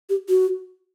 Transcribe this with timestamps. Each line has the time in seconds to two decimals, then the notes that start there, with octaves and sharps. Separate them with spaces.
0.10 G4
0.29 F#4